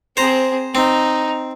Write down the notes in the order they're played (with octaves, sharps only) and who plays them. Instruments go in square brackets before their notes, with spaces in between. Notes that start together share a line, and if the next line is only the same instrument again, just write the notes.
[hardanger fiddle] C4 G#4 [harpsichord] C5 A#5
[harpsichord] C4 [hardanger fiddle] D#4